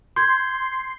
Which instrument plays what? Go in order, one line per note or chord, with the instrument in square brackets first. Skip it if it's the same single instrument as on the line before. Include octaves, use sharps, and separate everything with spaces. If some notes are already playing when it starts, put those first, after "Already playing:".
[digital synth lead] C6 [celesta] G6 G#6